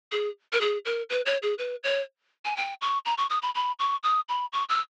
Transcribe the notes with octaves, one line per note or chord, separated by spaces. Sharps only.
G#4
A#4
G#4
A#4
B4
C#5
G#4
B4
C#5
G#5
G5
C#6
A#5
C#6
D#6
B5
B5
C#6
D#6
B5
C#6
E6